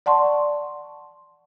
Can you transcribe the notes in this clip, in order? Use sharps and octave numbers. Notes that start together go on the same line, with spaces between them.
D5 F#5 A5 C6 C#6